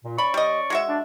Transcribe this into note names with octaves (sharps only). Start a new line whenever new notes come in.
A#2
C#4 D5 B5 C#6
G3 D#5
G#3 F#4 E5
D4